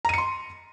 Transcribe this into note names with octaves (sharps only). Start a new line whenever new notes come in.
A#5 C6 C#7 D#7